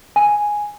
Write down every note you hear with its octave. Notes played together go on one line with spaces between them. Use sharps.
G#5